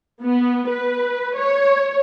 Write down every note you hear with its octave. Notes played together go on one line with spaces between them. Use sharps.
B3
B4
C#5